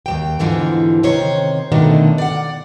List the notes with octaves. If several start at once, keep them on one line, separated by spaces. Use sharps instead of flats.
D#2 F#3 G5
G#2 B2 D3 E3 F3
C3 D#3 C5 C#5
B2 D3 D#3 F3 A3 D4
D5 F#5